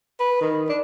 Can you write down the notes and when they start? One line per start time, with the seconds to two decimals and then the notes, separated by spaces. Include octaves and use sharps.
0.20 B4
0.41 D#3
0.69 D4